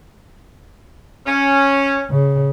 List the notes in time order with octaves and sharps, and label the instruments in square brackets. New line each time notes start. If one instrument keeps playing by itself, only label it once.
[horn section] C#4
[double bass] C#3